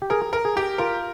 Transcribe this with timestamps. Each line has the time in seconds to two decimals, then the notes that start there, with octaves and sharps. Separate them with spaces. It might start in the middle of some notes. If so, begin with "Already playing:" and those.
0.02 G4
0.10 G#4 A#4
0.33 A#4
0.45 G#4
0.57 G4
0.78 F4 A#4